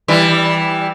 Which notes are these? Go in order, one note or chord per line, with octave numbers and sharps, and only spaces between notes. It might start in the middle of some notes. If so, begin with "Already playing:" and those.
E3 G3